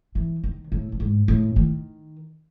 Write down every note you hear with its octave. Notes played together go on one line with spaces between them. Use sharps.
E3
D#3
A2
A2
G#2
A2
D#3